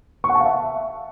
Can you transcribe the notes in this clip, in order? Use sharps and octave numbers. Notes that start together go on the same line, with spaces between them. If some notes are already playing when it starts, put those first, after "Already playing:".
C#6
F#5
A5
F5
E5